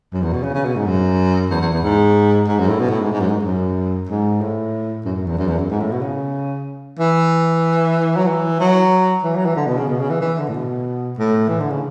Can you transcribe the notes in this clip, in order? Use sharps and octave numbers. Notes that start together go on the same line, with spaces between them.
F#2
E2
B2
C#3
C#3
B2
G#2
F#2
E2
E2
E2
G#2
G#2
F#2
A2
B2
A2
G#2
G#2
F#2
G#2
F#2
G#2
A2
F#2
F#2
E2
F#2
E2
F#2
G#2
A2
B2
C#3
E3
F#3
E3
F#3
E3
F#3
E3
D3
B2
C#3
B2
C#3
E3
E3
D3
A2
B2
A2
E3
D3
C#3